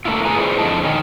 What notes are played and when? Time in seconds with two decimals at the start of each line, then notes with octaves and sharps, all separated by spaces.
0.05 A3 A#3 D4 E4 F4
0.25 G#4 B4 G#5 A#5
0.38 E4 F4 G#4 C5 D5
0.59 F2 D3 G#3 D#5 A5
0.84 D#3 C#4